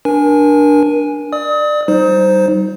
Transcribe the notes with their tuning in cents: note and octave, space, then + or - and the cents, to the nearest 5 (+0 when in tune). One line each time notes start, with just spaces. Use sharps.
D4 +0 A#4 +30 G#5 +0
D5 +25 D#6 +35
G3 -35 D#4 +0 C5 +0